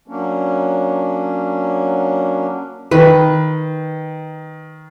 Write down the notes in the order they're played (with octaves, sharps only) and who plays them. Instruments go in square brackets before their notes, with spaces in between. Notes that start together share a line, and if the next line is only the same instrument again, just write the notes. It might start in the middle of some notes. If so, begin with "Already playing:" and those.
[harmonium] F#3 A#3 C#4 D4
[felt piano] D#3 [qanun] B4